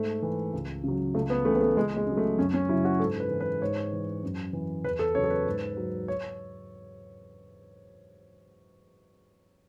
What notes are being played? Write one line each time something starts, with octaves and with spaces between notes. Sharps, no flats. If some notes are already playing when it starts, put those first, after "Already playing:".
Already playing: G#2 A3
E3
C#2
C#3 F#3
C#2 A3
B3
C#3 E3 A3
B3
A3
C#2 G#3
G#3
C#3 F#3
A3
F#2 C#4
C#4
C#3 F#3 E4
F#4
G#2 A4
B4
E3
B4
G#2 C#5
E3
F#2
E3
E2 B4
A4
C#3 F#3 C#5
A4
B4
G#2
F#3
C#5